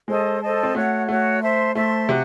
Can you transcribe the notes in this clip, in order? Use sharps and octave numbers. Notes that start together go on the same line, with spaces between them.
G#3 A4 C5 D#5 A5
A4 C5 D#5 A5
C4
A3 F#4 C#5 F#5
A3 F#4 C#5 F#5
C5 E5 A5 C6
A3 C5 E5 A5 C6
C3 F#4